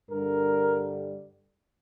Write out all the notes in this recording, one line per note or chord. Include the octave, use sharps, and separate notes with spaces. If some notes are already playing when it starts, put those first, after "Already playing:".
G2 D3 G3 A#4